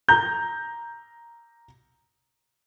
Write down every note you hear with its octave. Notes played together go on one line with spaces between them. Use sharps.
A#5 G6